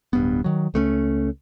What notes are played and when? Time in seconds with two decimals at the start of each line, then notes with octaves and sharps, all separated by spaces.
0.13 D1 G2 B3
0.44 D#3 F#3
0.74 C#2 A3 B3 C#4